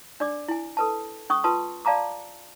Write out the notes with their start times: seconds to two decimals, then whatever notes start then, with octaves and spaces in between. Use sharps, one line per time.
0.20 D4 D5 D6
0.48 E4 G#5
0.77 A4 B4 A5
1.30 C#4 C#6 D#6
1.44 F4 B4 A5 C6 D#6
1.85 D5 F5 A5 A#5 D6